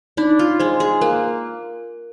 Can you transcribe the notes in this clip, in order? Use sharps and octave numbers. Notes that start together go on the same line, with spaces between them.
D4 D#4
F4
G#3 C5
G#4
A#3 A#4